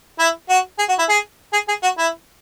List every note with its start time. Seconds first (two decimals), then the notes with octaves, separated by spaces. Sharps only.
0.19 E4
0.49 F#4
0.79 G#4
0.89 F#4
0.99 E4
1.09 G#4
1.53 G#4
1.68 G#4
1.83 F#4
1.98 E4